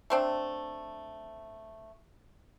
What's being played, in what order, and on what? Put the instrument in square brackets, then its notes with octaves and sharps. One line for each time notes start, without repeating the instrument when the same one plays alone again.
[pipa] A3 C4 D4